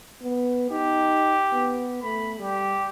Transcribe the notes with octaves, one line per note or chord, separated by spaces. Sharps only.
B3
D#4 G4
B3
A3 B5
G3 G4